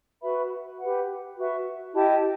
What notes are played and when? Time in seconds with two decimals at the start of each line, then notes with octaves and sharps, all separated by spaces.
0.21 F#4 B4 E5 B5
0.79 G4 B4 F#5
1.36 F#4 B4 E5
1.93 E4 G4 D#5 A5